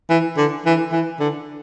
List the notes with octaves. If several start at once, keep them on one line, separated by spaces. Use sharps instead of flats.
E3
D3
E3
E3
D3